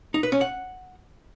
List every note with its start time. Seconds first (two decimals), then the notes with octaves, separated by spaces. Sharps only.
0.14 D#4
0.23 B4
0.32 C#4
0.41 F#5